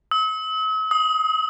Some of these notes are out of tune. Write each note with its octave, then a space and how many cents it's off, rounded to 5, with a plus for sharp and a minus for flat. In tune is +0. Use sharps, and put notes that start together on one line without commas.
E6 -45
D#6 +25